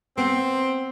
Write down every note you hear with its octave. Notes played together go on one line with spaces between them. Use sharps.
B3 C4